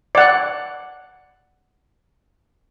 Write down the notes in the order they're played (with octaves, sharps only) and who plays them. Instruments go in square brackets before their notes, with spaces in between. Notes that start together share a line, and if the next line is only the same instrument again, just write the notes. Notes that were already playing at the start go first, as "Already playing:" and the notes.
[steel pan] D5 F#5